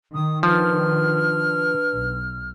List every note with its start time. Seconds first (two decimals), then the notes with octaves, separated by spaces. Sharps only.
0.14 D#3 D#6
0.43 F3 D4 B4 F6
1.93 B1